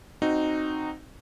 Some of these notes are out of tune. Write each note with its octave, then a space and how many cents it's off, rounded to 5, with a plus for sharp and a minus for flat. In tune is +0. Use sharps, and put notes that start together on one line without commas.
C4 +5 D#4 -10 F#4 +0